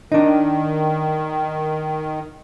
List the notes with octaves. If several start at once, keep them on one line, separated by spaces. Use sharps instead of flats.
D#3 D4 D#4